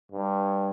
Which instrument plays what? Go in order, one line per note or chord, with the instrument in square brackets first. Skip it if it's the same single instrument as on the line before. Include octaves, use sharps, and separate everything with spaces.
[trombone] G2